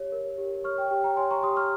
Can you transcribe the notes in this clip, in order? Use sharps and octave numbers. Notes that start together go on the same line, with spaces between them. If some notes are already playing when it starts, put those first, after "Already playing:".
Already playing: G4 C#5
A#4
G4
C#5 C#6 F6
G5
G4 G5
G5 A#5
C#5 G#5 C6
A#5 C#6
G4 C6 D#6
C#6 F6